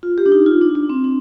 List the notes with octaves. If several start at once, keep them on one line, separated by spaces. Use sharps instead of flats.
F4
G4
D4
D#4
F4
D4
D4
C4
D4